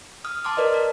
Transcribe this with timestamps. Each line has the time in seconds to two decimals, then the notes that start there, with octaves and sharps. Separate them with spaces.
0.24 D#6 F6
0.44 A5 C6 D6 F6
0.57 A#4 B4 D5 D#5
0.74 A#4